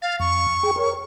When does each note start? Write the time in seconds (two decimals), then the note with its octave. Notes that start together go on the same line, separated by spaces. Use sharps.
0.02 F5 A6
0.20 F2 C#6
0.63 G#4 G5
0.76 A#4 C#5